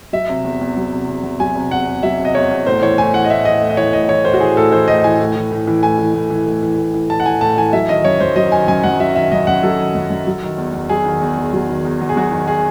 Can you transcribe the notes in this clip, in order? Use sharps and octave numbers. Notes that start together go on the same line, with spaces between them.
F#3 E5
C3
E2
E2
F#3
C3
E2
E2
F#3 G#5
C3
E2 F#5
E2
F#3 E5
C3
D#5
E2 C#5
E2
A2 C5
E3 C#5
A2 G#5
E3 F#5
D#5
A2 E5
E3 D#5
A2
D#5
E3 C#5
A2 D#5
E3 C#5
A2 C5
F#4
E3 G#4
A2 A4
E3 C5
A2 D#5
E3 G#5
A2
E3
A2
E3
A2 G#5
E3
A2
E3
A2
E3
A2
E3
A2 A5
F#5
E3 G#5
A2 A5
E3 G#5
F#3 E5
D#3 D#5
F#2 C#5
F#2 C5
F#3 D#5
D#3 G#5
F#2 G#5
F#2 F#5
F#3 E5
D#3 E5
F#2 D#5
F#2 F#5
F#3 A4
D#3
F#2
F#2
F#3
D#3
E2
E2
F#3 G#4
D#3
E2
E2
F#3
D#3
E2
E2
G#4
F#3 F#4
D#3
G#4